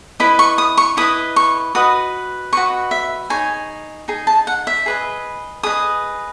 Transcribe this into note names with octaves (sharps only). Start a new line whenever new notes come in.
E4 B4 D#5 B5
C#6
D#6
C#6
E4 B4 D#5 D#6
C#6
F#4 B4 D#5 D#6
F#4 B4 D#5 C#6
E5
D#4 G#4 C#5 G#5
D#4 G#4
A5
F#5
E5
G#4 B4 D#5
G#4 B4 D#5 D#6